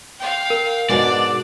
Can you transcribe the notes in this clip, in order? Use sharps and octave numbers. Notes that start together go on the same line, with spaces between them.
F5 G5
A#4
G#2 B2 G#3 D4 D5